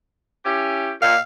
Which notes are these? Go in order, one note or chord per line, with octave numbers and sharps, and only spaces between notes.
C#4 E4 G4
A#2 F5